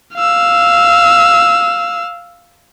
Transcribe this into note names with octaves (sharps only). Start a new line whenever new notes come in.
F5 E6